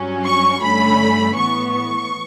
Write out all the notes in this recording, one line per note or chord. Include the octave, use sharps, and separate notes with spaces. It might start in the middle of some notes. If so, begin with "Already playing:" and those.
Already playing: G2 F#3 C#4
C#6
G2 D3 A3 C#4 B5
A2 E3 B3 C#6
C#6